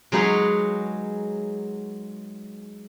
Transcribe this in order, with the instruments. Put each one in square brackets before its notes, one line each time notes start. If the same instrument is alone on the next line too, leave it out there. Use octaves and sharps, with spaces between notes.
[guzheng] F#3 G#3 D#4 G#4 B4 C#5